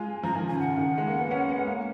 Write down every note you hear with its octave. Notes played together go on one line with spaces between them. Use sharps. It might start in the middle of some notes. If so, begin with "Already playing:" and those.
Already playing: G#3 F4 G#5
F3 A#5
D#3 G#5
C#3 G#5
F#5
C#3
D#3
G#3
A#3
B3
C#4
B3
G#3
A#3